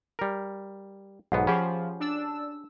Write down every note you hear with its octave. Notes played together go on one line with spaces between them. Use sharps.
G3 A#4
B1 G#2 B3 F#5
F3 C#4 G4 G#4 F#5 B5
D4 E6